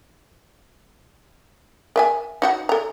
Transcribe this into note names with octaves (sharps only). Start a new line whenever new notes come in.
A#4 E5 G#5
D#4 F#4 F#5
A4 A#5